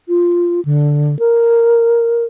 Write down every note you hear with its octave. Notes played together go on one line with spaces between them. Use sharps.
F4
D3
A#4